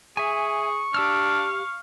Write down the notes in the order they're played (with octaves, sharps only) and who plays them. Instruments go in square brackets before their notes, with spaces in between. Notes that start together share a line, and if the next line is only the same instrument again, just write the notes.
[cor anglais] G#4 [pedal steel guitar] E5 G#5 [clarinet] C#6
[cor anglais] D4 [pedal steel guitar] G4 E6 F6 [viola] F5